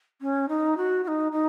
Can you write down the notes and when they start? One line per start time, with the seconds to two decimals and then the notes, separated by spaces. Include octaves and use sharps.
0.21 C#4
0.49 D#4
0.77 F#4
1.04 F#4
1.08 D#4
1.32 D#4